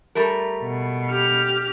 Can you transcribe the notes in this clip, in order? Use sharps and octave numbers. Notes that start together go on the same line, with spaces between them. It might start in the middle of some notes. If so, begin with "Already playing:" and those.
G3 A3 A#4
B2
G4 F6